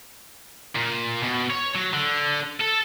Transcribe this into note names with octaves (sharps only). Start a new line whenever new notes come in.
A#2
B2
C#5
F#3
D3
A4